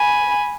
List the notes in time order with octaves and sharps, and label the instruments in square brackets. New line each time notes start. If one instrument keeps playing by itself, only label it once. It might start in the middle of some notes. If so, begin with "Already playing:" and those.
Already playing: [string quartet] G#5 B5